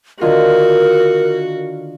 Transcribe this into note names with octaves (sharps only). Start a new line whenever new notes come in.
D3 D#3 F4 F#4 A#4